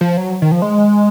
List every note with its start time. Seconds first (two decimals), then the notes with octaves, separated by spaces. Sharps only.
0.01 F3
0.17 F#3
0.42 D#3
0.52 F3
0.62 G#3